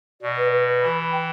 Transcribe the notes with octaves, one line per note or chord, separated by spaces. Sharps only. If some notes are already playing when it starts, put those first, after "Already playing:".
B2 D5
B4
B4
B4
E3 B5
B5
G5